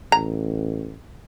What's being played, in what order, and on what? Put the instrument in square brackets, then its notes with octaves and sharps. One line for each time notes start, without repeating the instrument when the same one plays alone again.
[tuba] A1 [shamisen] A#5